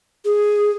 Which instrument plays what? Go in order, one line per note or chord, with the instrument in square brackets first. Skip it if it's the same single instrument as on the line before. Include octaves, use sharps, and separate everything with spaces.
[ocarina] G#4